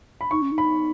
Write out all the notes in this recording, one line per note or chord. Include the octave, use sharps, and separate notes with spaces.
B5
D#4 C#6
C#4
D#4
B5